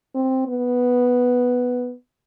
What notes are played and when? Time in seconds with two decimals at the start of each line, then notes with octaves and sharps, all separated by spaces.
0.15 C4
0.48 B3